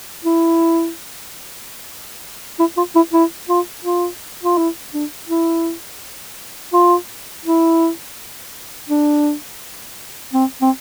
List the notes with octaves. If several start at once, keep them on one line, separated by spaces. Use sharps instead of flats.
E4
E4
F4
E4
E4
F4
F4
F4
E4
D4
E4
F4
E4
D4
C4
C4